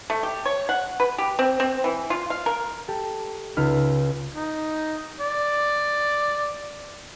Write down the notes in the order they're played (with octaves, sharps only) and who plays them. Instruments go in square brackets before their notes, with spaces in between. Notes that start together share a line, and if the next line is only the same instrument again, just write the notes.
[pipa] A3
G4
C#5
F#5
B4
G4
C4
C4
E3
F4
F5
A#4
[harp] G4 A4
C#2 D#4 B5 F6
[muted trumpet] D#4
D5